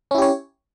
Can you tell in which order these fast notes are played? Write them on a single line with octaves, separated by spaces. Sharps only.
C#4 E4 G4 C#5